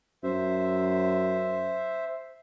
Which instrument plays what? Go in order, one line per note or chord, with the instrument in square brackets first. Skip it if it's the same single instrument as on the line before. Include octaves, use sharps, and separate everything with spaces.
[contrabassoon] F#2 [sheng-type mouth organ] C5 E5